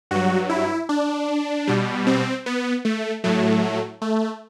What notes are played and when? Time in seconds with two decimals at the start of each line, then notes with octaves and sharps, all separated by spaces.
0.11 G2 F#3 F#4
0.49 E4
0.89 D4
1.67 B2 G3
2.07 C4
2.46 B3
2.85 A3
3.24 A2 F#3 A3
4.02 A3